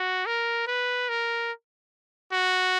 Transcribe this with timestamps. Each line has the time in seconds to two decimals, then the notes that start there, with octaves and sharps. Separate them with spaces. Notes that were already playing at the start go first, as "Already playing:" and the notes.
Already playing: F#4
0.26 A#4
0.67 B4
1.08 A#4
2.33 F#4